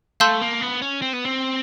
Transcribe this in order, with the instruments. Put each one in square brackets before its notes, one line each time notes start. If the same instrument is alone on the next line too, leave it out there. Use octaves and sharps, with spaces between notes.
[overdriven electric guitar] A3 [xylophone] F5 A5 C6 E6 G6
[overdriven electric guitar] A#3
B3
C#4
C4
B3
C4